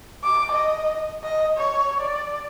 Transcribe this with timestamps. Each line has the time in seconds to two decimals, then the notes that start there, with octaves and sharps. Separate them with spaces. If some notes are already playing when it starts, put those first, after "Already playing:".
0.23 D6
0.52 D#5
1.23 D#5
1.57 C#5
2.00 D5